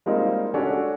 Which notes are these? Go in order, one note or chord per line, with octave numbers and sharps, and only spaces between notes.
G3 G#3 A#3 C4 D#4 F4
C#4 D4 F#4 G4 A4